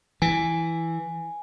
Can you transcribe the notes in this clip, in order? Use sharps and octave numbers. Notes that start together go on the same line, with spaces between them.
E3 G#5